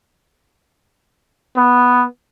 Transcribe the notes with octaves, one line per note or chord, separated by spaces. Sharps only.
B3